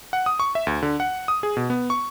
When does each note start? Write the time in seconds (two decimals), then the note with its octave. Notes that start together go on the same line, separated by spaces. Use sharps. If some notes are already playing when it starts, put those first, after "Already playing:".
0.13 F#5
0.26 D#6
0.40 C#6
0.55 E5
0.67 D2
0.82 D3
1.00 F#5
1.28 D#6
1.43 G#4
1.57 B2
1.70 B3
1.90 C#6